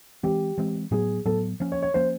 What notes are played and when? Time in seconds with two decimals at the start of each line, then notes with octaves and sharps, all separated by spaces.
0.23 E3 G#3 C4 G4
0.58 E3 G#3 C4
0.91 A2 F#3 B3 G#4
1.25 A2 F#3 B3 A4
1.60 F3 A#3 C#4
1.72 C#5
1.83 C#5
1.94 F3 A#3 C#4 C5